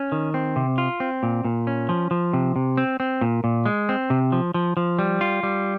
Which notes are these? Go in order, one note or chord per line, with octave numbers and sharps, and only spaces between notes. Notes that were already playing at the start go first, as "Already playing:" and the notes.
Already playing: C#4
D#3
C4
C3
F4
C4
A#2
A#2
C#4
F3
F3
C3
C3
C4
C4
A#2
A#2
G#3
C4
C3
F3
F3
F3
G3
F4
G3